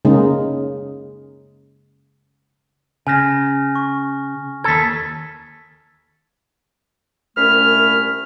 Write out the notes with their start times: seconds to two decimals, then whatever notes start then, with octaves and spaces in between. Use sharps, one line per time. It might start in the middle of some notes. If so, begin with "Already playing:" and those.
0.05 C#3 G#3 A#3 D#4
3.07 C#3 G#5 F6 A#6
3.75 C#6
4.64 D#2 A4 G#6 B6
7.37 C2 A#2 A3 C#4 B5 F6